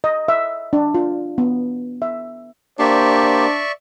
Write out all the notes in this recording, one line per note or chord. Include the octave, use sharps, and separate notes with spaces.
D#5
E5
D4
F4
B3
E5
A#3 D4 G4 C5 D5 E5 C#6